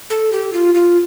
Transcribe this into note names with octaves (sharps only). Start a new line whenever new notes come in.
A4
G4
F4
F4